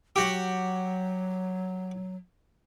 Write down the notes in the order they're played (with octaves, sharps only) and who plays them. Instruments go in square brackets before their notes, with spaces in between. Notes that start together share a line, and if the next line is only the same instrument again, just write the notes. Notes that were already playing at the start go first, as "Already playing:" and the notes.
[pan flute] F#3 [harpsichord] F#4 G4